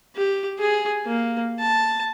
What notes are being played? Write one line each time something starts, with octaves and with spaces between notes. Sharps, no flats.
G4
G#4
A#3
A5